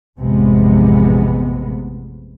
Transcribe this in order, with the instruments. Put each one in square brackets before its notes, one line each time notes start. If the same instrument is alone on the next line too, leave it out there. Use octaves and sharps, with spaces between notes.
[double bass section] A1 F2 C3 G#3 B3